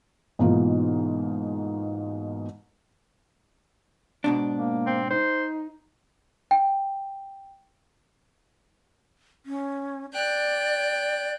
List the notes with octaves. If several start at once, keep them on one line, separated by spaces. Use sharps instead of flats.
G#2 B2 E3 A#3 D#4 F4
G#2 B2 D4
A#3
C4
D#4 C5
G5
C#4
D5 G5 F#6